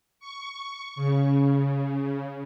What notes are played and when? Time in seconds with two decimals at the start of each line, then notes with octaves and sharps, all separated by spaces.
0.20 C#6
0.96 C#3